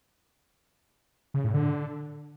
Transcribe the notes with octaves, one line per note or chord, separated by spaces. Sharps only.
C#3
A2
D3